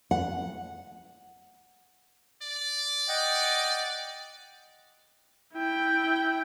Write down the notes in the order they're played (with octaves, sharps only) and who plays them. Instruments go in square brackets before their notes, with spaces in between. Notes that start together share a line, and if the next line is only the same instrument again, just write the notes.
[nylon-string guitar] F#5
[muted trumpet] D5
[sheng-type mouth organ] D#5 F#5 G5
[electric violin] E4 G5